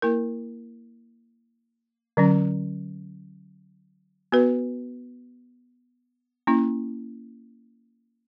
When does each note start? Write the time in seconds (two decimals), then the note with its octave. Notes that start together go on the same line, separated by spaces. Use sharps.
0.02 A#3 E4 A#4
2.17 D3 F#3 C#4
4.32 B3 F#4 B4
6.47 A#3 C#4 E4